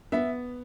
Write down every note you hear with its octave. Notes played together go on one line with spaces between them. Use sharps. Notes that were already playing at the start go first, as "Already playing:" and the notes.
B3 E5